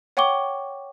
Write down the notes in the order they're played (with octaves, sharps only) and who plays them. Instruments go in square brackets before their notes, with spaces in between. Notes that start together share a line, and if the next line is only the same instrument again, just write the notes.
[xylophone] C#5 F#5 G5 C#6 D6 G7